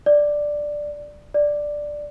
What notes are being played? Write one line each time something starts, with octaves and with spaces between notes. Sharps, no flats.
D5
D5